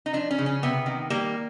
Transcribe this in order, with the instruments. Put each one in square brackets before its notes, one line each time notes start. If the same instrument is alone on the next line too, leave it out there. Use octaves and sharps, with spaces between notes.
[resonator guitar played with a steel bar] D#4
F3 D4
C#4
C#3
C#4
C3 B3
D#3
G3 A#3